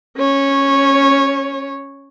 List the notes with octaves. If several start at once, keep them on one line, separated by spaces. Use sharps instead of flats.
C#4 C#5